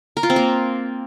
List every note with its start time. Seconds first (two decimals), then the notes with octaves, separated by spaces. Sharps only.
0.17 A#4
0.23 F4
0.30 C4
0.36 A#3